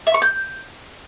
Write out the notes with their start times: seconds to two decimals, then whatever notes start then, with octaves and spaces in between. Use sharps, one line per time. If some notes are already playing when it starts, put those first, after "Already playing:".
0.07 E5
0.14 C#6
0.22 G6